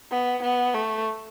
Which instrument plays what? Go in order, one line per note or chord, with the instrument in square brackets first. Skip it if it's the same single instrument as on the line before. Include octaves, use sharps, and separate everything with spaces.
[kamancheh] B3
B3
A3